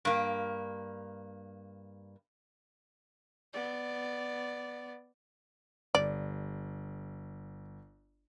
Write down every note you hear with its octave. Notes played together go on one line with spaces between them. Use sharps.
G2 A#3
B3 D5
G1 D5